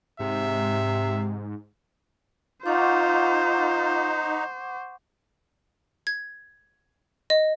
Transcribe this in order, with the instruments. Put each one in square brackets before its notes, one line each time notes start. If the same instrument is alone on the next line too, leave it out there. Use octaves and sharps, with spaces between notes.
[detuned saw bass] G#2 [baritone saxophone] C3 [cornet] E5
[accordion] D#4 [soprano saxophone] F4 [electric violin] C5 [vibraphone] F#5 C#6 D6
[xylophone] G#6
D#5